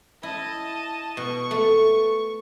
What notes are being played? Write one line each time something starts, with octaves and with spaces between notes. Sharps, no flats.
E4 D#5 A5
B2 C#6
A3